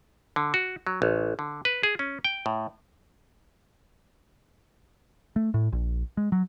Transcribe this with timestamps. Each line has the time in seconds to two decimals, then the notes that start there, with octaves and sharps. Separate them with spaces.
0.36 D3
0.54 F#4
0.87 F#3
1.02 A1
1.39 D3
1.65 B4
1.83 G#4
1.99 C#4
2.24 G5
2.46 A2
5.36 A3
5.54 A2
5.72 A#1
6.17 G#3
6.32 F#3